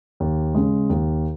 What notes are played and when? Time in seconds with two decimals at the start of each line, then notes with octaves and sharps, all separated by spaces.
0.20 D#2
0.55 C#3 G#3
0.90 D#2